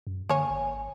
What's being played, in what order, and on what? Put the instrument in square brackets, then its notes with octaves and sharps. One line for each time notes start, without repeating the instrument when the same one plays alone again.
[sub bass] F#2
[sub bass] D3 [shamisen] A#3 C#5 [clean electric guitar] G#5
[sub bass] G#1